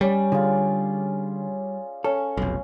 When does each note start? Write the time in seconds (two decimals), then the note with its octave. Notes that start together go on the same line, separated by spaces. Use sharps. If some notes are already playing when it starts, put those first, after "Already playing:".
0.01 G3 C#4 D5
0.32 D3 F4 G#4
2.04 C#4 A4
2.37 F1 B1